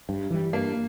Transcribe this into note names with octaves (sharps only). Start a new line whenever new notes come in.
G2
E3 G3
G2 A#3